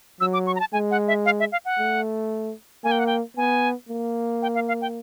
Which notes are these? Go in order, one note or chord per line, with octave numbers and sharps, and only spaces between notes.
F#3 E6
D6
C#6
A#5
A5
G#3 G#5
F#5
E5
F5
E5
F5
F#5
A3
A#3 G#5
G5
F#5
G5
B3 G#5
A#3
G5
F5
F5
G5